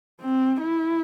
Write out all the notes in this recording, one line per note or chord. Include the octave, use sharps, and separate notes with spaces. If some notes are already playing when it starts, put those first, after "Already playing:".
C4
E4